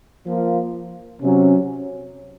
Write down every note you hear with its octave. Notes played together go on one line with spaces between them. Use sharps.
F3 A#3 F4
C3 F#3 C#4